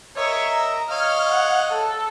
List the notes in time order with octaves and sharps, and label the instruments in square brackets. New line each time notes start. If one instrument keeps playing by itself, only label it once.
[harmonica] A#4 D#5 E5 [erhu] C#5
[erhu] A#5
[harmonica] C#5 D#5 F5 [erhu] F6
[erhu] F#5
A4